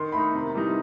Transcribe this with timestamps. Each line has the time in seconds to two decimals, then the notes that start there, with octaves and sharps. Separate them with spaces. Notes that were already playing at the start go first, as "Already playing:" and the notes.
Already playing: D#3 C6
0.12 A3 D#4 B5
0.33 C3
0.54 E3 G3 D#4